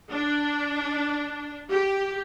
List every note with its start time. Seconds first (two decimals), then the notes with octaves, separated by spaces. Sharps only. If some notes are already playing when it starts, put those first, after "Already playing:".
0.11 D4
1.72 G4